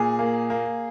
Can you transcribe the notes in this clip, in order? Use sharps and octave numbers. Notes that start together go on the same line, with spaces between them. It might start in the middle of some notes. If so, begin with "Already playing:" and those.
Already playing: A#2 G#4
A#3
A#3